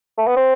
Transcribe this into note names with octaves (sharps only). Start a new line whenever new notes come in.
A3
B3
C4